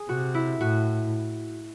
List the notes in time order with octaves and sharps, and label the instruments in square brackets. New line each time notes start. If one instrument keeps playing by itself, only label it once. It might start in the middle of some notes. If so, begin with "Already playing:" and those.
Already playing: [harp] G#4
[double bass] C3 [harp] F#4
[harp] E4
[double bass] A2 [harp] F#4